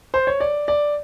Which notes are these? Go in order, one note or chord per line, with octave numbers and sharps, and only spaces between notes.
C5
C#5
D5
D5